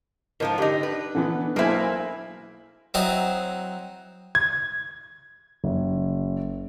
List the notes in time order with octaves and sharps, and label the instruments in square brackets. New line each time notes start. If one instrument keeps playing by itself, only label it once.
[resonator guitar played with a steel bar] G#2 F3 F4 [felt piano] A#4
[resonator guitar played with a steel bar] D3 D#4 [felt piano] G4
[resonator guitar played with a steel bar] B4
[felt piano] D3 E3 B3
[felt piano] B1 C5 G#5 [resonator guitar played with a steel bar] A#3 E4
[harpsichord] F#3 C4 D#4 E4 C5 D#5
[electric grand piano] G#6
[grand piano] F#1